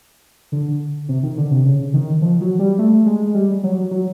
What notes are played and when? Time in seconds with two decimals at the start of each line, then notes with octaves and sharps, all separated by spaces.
0.52 D3
1.09 C3
1.23 D#3
1.37 D3
1.51 C3
1.66 C#3
1.94 D#3
2.22 F3
2.41 F#3
2.59 G3
2.79 A3
3.06 G#3
3.34 G3
3.64 F#3
3.91 F#3